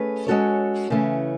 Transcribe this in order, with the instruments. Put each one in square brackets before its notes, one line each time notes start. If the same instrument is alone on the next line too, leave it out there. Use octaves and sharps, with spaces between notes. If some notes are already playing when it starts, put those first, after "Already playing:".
Already playing: [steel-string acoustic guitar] A3 C#4 G#4 B4
G#3 C#4 F#4 A4 C#5
C#3 E3 A3 C#4